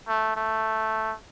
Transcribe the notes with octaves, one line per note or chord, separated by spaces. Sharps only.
A3
A3